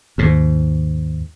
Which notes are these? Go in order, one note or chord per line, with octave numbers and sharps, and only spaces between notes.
D#2 G#2